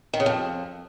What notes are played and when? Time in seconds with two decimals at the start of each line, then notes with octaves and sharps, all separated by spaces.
0.13 D#3
0.20 C#3
0.26 F2